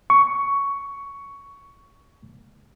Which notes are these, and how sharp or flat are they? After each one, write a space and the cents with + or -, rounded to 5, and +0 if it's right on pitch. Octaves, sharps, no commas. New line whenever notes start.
C#6 +10